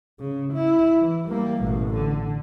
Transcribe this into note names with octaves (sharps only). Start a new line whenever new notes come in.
C#3
E4
E3
G3 A#3
A1 B2
D3